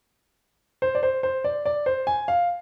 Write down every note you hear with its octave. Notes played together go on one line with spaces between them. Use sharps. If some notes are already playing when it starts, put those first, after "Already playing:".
C5
D5
C5
C5
D5
D5
C5
G#5
F5